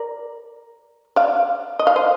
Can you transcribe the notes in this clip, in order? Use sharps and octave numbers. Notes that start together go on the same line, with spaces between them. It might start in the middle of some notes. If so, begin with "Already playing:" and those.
Already playing: A#4 D5
D5 F5
D#5
F5
C5 D#5